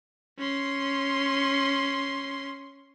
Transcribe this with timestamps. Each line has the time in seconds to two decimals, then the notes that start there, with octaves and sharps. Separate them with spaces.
0.39 C#4 C6